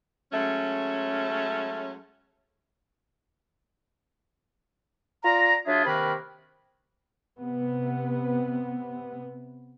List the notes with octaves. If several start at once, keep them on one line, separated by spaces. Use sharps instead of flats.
F#3 G#3 A3 C#4
F4 D5 A#5
F#3 D4 F4 G#4 E5
C3 D#3 A#3 B4 B5
C3 B3